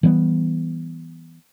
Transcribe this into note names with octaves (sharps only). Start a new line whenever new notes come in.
E3 G3 B3